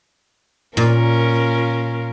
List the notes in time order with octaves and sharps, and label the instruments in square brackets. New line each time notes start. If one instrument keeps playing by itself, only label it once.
[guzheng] A#2 [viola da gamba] C#4 F4 A#4